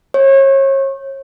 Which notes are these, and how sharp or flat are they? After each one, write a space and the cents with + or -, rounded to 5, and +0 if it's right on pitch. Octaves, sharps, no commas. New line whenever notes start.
C#5 -35